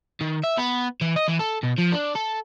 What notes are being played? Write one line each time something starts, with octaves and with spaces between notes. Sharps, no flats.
D#3
E5
B3
E3
D#5
E3
A4
B2
F3
D4
A4